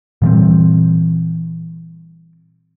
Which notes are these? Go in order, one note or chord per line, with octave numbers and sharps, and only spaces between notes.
A#2 E3 G3 C4